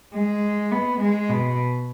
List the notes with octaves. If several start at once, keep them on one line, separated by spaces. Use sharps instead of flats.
G#3
B3
G#3
B2